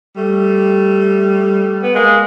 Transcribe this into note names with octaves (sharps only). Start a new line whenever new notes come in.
G3 A3
B3
G#3 A#3